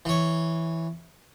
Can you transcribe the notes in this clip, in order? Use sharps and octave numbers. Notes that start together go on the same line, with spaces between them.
E3 C#5